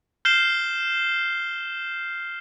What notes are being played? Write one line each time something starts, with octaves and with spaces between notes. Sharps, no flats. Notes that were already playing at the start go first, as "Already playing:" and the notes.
F6 G6 C7 E7 G7